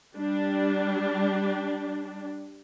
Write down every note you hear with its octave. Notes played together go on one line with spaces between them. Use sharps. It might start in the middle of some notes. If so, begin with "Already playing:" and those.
G3 D4